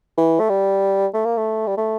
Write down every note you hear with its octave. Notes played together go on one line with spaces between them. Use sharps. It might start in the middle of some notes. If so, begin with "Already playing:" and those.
E3
A3
G3
A3
A#3
A3
G3
A3